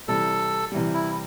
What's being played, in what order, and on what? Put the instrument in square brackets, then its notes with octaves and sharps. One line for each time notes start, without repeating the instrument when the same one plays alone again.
[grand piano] C3 E3 G3 [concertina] A4
[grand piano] C3 E3 G3
[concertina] E4